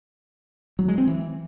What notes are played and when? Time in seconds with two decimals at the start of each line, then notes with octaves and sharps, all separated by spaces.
0.79 F#3
0.88 G#3
0.98 C4
1.07 E3